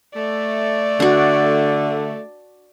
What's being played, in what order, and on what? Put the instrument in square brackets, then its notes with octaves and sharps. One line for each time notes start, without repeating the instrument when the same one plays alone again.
[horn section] A3 [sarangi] D5
[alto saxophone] D3 [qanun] D4 F#4